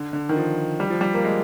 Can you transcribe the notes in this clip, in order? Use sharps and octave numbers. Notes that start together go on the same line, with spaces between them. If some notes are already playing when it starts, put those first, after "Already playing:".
Already playing: D3
D3
D#3
F3
G3
F3
G3
A#3
G#3